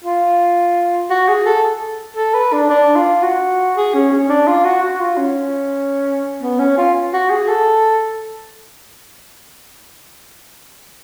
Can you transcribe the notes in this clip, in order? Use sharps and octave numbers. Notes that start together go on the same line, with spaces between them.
F4
F#4
G#4
A4
A4
B4
D4
D4
F4
F#4
G#4
C#4
C#4
D4
F4
F#4
F#4
F4
C#4
B3
C#4
F4
F#4
G#4
A4